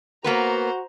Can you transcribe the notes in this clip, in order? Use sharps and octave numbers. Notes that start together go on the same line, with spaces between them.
A#3 B3 F#4 B4 C5 A#5